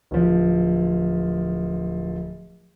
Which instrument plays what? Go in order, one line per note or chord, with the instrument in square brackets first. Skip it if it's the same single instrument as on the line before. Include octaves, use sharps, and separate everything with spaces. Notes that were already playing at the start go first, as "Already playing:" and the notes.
[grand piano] D1 F3